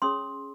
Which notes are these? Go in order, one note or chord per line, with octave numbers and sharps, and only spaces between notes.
C#4 G#4 C#5 C6 D#6